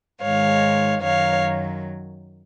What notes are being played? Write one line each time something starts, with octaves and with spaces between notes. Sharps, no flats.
G#2 D#3 G#3 C#5 F5
F#2 D#3 F#3 C#5 F5